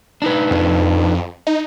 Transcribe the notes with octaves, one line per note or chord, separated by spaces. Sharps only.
D4 D#4 B4
F2
D#4